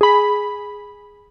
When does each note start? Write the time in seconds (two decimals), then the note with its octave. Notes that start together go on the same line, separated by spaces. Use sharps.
0.01 G#4 B5